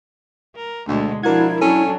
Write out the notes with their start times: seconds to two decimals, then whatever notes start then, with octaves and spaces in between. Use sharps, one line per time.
0.56 A#4
0.88 D2 B2 D3 G#3
1.23 F3 D4 E4 F#4 A#4 G#6
1.61 F#3 C#4 D4 A4